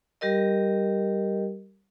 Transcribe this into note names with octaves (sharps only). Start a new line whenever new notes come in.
G3 G4 A#4 D#5